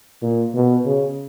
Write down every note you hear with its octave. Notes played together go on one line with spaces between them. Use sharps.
A#2
B2
C#3